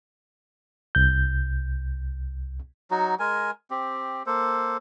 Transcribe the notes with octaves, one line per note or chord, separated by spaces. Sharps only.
C2 G6
F#3 D#4 F#4
G#3 A#4 G#5
C4 G4
A#3 A4 C5